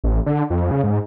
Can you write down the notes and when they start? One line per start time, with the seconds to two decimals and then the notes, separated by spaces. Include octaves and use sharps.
0.04 A1
0.26 D3
0.50 F2
0.71 C#3
0.83 G#2